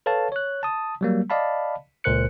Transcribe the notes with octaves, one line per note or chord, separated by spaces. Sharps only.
A4 B4 C#5 F5 A5
C#5 F#6
A5 D#6
F#3 G3 A#3
D5 D#5 F5 A5 B5
C#2 A#2 A#4 C5 F#6 C#7